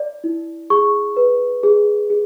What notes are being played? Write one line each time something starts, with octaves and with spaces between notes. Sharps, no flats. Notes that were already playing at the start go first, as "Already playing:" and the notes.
Already playing: D5
E4
G#4 C#6
B4
G#4
G#4